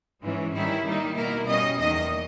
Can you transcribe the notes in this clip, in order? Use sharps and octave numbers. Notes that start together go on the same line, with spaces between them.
G#2 E3 G#3 C#4
D#3 G3 C#4 E4
D#3 G3 A#3 D#4
B2 A#3 E4 A#4
B2 G3 C#4 D#5
E2 D#3 A#3 D#5